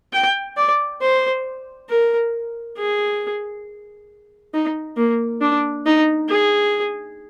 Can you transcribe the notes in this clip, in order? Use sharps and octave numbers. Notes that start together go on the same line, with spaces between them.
G5
D5
C5
A#4
G#4
D#4
A#3
D4
D#4
G#4